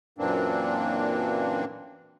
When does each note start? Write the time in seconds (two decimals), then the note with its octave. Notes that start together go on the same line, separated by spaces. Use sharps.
0.18 F#2 A#2 E3 A#3 C4 D4